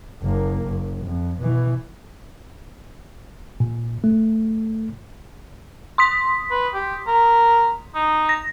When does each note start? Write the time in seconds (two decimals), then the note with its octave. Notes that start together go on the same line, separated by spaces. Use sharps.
0.23 F#1 A#3
0.68 F#1
1.05 F2
1.39 B2 E3
3.60 A#2
4.04 A3
5.98 C6 D#6 B6
6.51 B4
6.74 G4
7.07 A#4
7.95 D#4
8.29 A#6